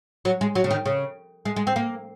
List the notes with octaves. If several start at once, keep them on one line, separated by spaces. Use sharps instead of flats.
F#3
G#3
F#3
C#3
D#3
C#3
G#3
G#3
C4
A#3